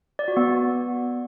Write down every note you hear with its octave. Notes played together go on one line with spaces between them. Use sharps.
D5
F#4
B3